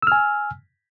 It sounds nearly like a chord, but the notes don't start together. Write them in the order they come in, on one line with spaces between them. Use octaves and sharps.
E6 F6 G#5